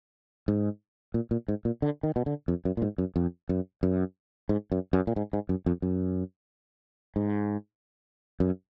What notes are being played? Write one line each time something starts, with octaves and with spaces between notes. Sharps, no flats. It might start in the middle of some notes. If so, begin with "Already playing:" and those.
G#2
A#2
A#2
G#2
A#2
D3
D#3
B2
D3
F2
F#2
A#2
G#2
F#2
F2
F#2
F#2
G#2
F#2
F#2
A#2
G#2
G#2
F#2
F2
F#2
G#2
F#2